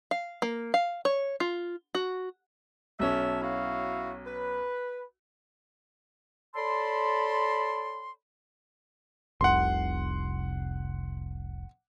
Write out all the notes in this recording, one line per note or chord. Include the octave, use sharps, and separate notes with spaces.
F5
A#3
F5
C#5
F4
F#4
B1 C#4 E5 A5
E4 F#4 F5
B4
A4 C#5 D5 A5 B5 C6
F1 C2 F#5 C6